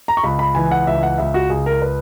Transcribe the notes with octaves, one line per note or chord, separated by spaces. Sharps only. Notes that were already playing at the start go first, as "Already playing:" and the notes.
A#5
C#6
C#2 B5
B5
E3 G#5
F#5
C#2 E5
F#5
C#2 E5
F#4
C#2 G#4
A#4
B4